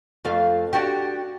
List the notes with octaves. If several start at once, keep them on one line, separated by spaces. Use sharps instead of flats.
F2 A3 F5
D4 F#4 G4